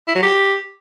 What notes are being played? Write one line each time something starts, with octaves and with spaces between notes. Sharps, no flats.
E4
F#3
G4